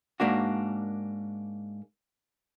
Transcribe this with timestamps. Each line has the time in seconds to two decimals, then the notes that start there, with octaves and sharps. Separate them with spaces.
0.20 G#2 A#3 D4 F#4